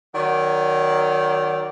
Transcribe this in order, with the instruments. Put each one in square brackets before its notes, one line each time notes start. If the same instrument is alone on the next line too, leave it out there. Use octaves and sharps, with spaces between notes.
[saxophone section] D#3 F#3 D5